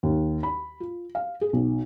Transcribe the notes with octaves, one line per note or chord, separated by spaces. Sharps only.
D#2
B5
F4
F5
G#4
B1